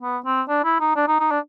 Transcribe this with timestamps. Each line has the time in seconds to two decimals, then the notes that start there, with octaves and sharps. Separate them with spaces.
0.01 B3
0.25 C4
0.49 D4
0.64 E4
0.80 D#4
0.96 D4
1.08 D#4
1.20 D#4
1.31 D4